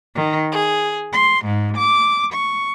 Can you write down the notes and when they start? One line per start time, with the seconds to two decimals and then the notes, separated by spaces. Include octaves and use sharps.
0.14 D#3
0.50 G#4
1.12 C6
1.44 G#2
1.76 D6
2.32 C#6